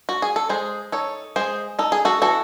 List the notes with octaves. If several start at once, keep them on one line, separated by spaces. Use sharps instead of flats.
F#4
G#4
A4
G#3 G#4 C5
D#4 A4 C#5
G#3 G#4 C5
D#4 A4
G#4
F#4 A4
E3 F#4 A4